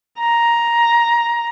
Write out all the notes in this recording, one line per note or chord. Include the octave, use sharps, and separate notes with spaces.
A#5